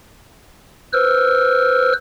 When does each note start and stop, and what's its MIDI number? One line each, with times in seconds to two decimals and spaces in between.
0.93 1.93 71
0.93 1.93 72
0.93 1.93 88
0.93 1.93 89